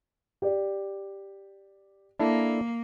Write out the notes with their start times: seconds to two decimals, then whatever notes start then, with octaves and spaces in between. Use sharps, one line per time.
0.42 G4 D5
2.19 A#3 D4 E4 A4